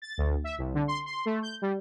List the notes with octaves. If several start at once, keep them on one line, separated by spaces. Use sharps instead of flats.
A6
D2
E5
C2
D3
C6
C6
A3
G6
G3